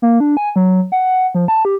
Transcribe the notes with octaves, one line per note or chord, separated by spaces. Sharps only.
A#3
D4
G#5
F#3
F#5
F3
A5
G4